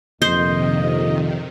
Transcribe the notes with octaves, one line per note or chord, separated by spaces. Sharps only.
A#1 F2 C3 D#3 C5 D#5